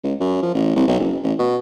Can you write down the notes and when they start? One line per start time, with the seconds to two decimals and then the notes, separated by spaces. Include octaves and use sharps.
0.04 C#2
0.20 F#2
0.43 F3
0.55 A1
0.76 C2
0.88 B1
1.00 F#1
1.24 A1
1.39 B2